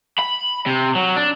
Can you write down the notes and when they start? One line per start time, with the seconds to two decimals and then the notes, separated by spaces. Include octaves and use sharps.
0.19 B5
0.66 C3
0.95 F#3
1.16 D4